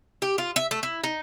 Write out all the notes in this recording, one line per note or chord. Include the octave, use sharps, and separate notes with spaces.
G4
F4
E5
A3
E4
D#4